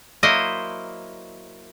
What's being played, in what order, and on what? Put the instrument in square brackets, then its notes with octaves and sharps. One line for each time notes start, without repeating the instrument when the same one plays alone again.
[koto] F#3 A#3 E4 C5 D#5